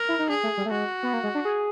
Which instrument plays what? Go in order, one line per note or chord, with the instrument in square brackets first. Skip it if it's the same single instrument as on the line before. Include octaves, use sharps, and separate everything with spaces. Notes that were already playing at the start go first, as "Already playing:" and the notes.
Already playing: [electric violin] A#4
[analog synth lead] E4
D#4
[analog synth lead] D4 [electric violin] G#4
[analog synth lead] A3
G3
A3
[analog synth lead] G#3 [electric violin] F#4
[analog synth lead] B3
A#3
G#3
D4
G#4